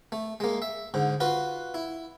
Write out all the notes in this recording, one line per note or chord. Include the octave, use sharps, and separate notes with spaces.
A3
G#3 A#3
E5
G#2 D3
F4 F#4 B4
E4